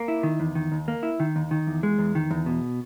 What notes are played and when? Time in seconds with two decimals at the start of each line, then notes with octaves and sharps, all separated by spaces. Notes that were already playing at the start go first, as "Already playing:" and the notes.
Already playing: A#3
0.08 E4
0.23 D#3
0.40 E2
0.55 D#3
0.72 D#2
0.88 A#3
1.03 E4
1.20 D#3
1.36 D#2
1.51 D#3
1.67 E2
1.83 G#3
1.98 E2
2.15 D#3
2.31 E2
2.46 B2